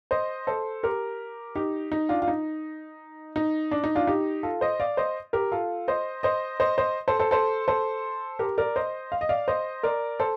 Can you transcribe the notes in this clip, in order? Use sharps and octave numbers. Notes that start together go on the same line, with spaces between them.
C5 D#5
A4 C5
G4 A#4
D#4 G4
D#4
D4 F4
F4
D#4
D#4
D4
D#4
D4 F4
D#4 G4
F4 A4
C5 D#5
D5 F5
C5 D#5
G4 A#4
F4 A4
C5 D#5
C5 D#5
C5 D#5
C5 D#5
A4 C5
A4 C5
A4 C5
A4 C5
G4 A#4
A#4 D5
C5 D#5
F5
D#5
D5 F5
C5 D#5
A#4 D5
A4 C5